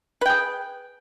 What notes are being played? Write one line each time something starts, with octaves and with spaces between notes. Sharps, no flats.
G#4 B4 G5